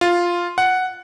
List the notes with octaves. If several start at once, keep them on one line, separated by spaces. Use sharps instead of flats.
F4
F#5